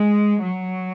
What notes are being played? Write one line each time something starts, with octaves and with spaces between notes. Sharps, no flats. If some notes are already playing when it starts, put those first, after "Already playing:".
Already playing: G#3
F#3